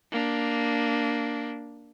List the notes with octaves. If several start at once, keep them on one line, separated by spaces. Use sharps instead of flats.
A#3 D4